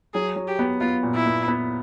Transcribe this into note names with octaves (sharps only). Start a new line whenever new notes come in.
F#3 G#4
F#3
G4
B3
B3 F4
A#2
E4
B3
B3